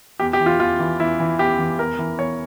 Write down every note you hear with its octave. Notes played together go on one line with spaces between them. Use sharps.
E2 G4
G4
E3
F4
E2 F4
E3
E2 E4
E3
E2 G4
E3
E2 A#4
E3
E2 C#5